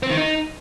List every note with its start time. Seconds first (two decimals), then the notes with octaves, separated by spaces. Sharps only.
0.03 C4
0.10 D#3
0.17 D#4